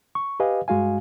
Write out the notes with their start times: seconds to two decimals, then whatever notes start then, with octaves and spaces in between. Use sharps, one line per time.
0.15 C#6
0.40 G4 B4 D#5 F5 G#5
0.68 G2 G#3 F#4 F5 G#5